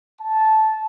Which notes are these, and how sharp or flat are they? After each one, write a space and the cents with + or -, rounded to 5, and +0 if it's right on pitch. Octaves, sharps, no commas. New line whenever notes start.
A5 -10